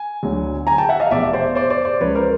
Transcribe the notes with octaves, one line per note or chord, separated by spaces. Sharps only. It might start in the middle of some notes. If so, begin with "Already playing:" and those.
Already playing: G#5
D2 D3 F#3
G#5 A#5
G5 A5
E5 F#5
D#5 F5
F1 E2 B2 D5 E5
C5 D5
C5 D5
C5 D5
C5 D5
C#2 C#3 F3 B4 C#5
A#4 C5